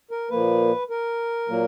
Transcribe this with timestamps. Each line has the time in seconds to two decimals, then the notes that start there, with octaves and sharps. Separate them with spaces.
0.11 A#4
0.30 A#2 F3 A#3 B4
0.90 A#4
1.48 A#2 F#3 A#3